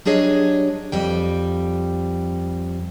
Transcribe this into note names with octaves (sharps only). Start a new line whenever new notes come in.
F#3 G3 D4 G#4 C#5 D#5
F2 G3 G5